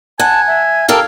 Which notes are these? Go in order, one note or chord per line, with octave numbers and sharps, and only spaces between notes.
F#5 G#5 A5
E5
G4 A4 A#4 F5 A5